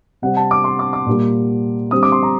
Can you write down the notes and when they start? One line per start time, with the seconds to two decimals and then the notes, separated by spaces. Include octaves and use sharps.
0.22 C3 G3 C4 F#5
0.36 A5
0.51 D6
0.64 C6
0.79 D6
0.93 D6
1.06 A#2 G3 A#3
1.91 D3 G3 C4 D#6
2.03 D6
2.12 C6
2.23 A#5